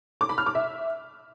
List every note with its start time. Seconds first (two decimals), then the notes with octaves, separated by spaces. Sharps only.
0.21 D6
0.29 B5
0.38 F6
0.46 D6
0.55 E5